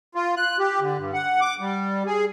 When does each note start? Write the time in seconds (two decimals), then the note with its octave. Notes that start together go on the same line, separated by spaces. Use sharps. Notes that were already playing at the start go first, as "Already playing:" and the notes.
0.15 F4
0.36 F#6
0.59 G4
0.80 D3
0.98 G2
1.13 F#5
1.41 D6
1.60 G3
2.06 G#4